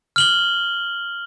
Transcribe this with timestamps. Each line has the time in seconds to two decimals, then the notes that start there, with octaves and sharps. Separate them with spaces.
0.16 F6 F#7 G7